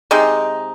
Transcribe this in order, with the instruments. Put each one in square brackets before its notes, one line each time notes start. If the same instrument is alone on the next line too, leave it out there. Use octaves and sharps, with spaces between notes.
[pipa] C3 G#3 D#4